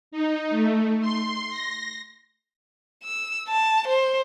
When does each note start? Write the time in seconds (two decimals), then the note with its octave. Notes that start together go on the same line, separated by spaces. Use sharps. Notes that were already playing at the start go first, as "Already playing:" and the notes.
0.11 D#4
0.50 A3
1.01 C6
1.50 A#6
3.04 E6
3.49 A5
3.88 C5